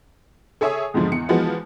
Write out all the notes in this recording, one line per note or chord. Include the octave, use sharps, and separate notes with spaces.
G#4 A4 C#5 E5 G#5 D#6
E2 G#2 D3 F3 G#3
E2 C#7
E3 F3 G#3 B3 F#4